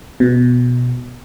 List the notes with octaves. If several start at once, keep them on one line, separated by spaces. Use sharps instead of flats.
B2